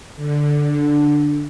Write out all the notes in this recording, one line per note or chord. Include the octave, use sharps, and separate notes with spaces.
D3